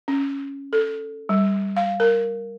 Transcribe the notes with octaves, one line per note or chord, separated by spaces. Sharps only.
C#4
A4
G3
F5
A#4